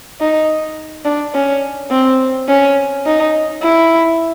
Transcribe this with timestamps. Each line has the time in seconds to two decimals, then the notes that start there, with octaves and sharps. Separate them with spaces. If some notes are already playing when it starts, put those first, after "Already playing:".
0.21 D#4
1.05 D4
1.35 C#4
1.91 C4
2.49 C#4
3.06 D#4
3.63 E4